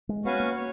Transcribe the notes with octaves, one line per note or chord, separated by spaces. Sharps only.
G#3
B3 C#4 F#4 B4 F5 G#5
A#3
C#5